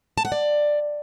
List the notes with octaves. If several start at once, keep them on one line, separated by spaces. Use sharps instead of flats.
A5
F#5
D5